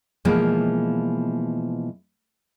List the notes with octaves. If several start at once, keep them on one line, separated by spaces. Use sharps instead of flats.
B2 E3 F3 G#3 A#3 B3